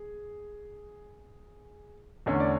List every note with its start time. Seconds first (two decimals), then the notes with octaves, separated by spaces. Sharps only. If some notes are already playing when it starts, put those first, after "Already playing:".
Already playing: G#4
2.26 E2 D3 A3 C#4
2.40 D5